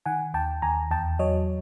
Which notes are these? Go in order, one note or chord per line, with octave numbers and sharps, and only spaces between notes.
D#3 F#5 G#5
D#2 G5 A5
D#2 G#5 A#5
E2 G5 A5
F#3 C#5 D#5